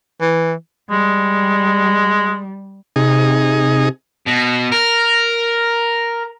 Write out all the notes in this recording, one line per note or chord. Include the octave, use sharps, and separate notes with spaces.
E3
G3 G#3
C3 D#4 G#4
B2
A#4